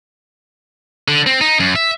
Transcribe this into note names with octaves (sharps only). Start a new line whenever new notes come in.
D3
C4
D#4
F#2
E5